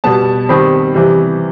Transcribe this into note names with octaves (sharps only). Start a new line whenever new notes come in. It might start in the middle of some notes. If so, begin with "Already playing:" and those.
B2 G3 B3 A5
D#3 G3 C4 B5
C3 E3 G3